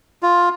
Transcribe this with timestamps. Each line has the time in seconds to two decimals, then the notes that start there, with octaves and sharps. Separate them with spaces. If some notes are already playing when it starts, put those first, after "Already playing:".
0.23 F4